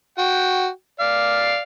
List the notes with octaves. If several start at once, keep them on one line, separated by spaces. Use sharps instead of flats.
F#4 G5
D5 F5